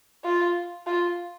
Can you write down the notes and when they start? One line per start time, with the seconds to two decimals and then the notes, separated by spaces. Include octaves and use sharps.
0.24 F4
0.87 F4